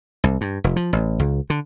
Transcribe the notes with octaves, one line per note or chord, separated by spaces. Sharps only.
C2
G2
F1
F3
A1
C#2
D3